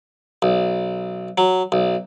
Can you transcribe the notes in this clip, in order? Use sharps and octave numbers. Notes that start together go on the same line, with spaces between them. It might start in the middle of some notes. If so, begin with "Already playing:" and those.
B1
F#3
B1